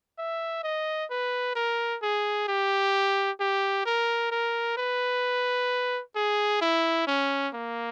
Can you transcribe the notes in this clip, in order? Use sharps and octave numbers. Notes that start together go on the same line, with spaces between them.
E5
D#5
B4
A#4
G#4
G4
G4
A#4
A#4
B4
G#4
E4
C#4
A#3